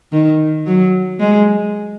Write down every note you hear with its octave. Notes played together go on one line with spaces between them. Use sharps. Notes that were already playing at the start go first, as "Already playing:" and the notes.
D#3
F#3
G#3